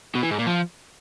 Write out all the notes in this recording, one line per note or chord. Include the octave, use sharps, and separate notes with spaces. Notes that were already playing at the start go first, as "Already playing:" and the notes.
B2
E3
G#2
A#2
F3